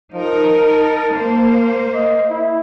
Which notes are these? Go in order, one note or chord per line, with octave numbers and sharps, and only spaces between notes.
F3 D#4 A#4
A5
A#3 C5
D#5
E4